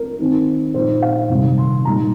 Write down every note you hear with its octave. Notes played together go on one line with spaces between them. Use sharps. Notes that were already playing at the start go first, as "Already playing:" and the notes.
Already playing: A#4
D#3 C4 D#4
A#2 F3 D#4 C5
F5
C3 D#3 G3
C6
A#2 G3 A#3 D#4 A#5